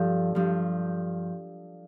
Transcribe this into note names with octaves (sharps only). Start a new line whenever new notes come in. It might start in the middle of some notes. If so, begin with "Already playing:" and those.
Already playing: G2 F3 A4
G2 F3